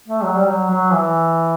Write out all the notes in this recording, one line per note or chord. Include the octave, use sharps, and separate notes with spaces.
A3
F#3
G3
F#3
F#3
E3